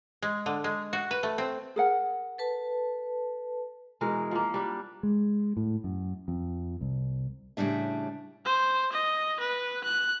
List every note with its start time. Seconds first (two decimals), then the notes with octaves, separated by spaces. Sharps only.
0.22 G#3
0.46 D3
0.64 G#3
0.93 F#4
1.11 B4
1.23 A3
1.38 C4
1.76 G#4 A#4 F#5
2.38 A4 B4 A5
4.01 B2 E3 G#3 A#4
4.31 F3 A#3
4.54 G3 D4
5.03 G#3
5.57 A2
5.84 F#2
6.28 F2
6.81 C2
7.57 A2 C#3 G3 D4 E5
8.45 C5
8.93 D#5
9.40 B4
9.84 F#6